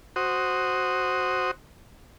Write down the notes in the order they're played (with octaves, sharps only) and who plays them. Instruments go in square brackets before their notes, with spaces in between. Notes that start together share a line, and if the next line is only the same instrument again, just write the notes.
[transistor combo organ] F#4 C5 D#6